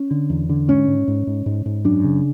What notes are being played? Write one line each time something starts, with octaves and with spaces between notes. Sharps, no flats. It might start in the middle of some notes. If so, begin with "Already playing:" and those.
Already playing: C#4
D3
E2
D3
G#2 C#4
G#2
G#2
G#2
G#2
G#2
F#2 D4
C#3